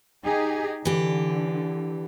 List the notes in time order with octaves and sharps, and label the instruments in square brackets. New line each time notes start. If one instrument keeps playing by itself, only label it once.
[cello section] D#4 G4 G#4
[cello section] D3 [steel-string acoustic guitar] E3 G4